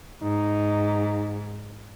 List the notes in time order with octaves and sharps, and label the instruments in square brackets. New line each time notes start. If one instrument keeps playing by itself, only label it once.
[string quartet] G#2 [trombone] D#4